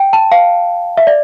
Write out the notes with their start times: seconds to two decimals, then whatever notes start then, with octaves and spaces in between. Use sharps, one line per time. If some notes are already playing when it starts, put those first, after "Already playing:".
Already playing: G5
0.13 A5
0.32 F5
0.97 E5
1.07 D5